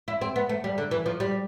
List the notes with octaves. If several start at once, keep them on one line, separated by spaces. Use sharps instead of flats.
E4
C4
B3
A3
G3
D3
E3
F3
G3